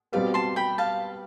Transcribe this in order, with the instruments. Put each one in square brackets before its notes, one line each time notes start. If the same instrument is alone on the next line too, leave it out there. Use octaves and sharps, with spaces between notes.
[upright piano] B2 G3 C4 G4 B4 [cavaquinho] D5 F5
[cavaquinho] A5 C6
G5 B5
F5 A5